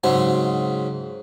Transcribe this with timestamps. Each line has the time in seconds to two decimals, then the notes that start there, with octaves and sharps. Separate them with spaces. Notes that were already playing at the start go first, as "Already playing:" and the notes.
0.04 G#2 C#3 F#3 C4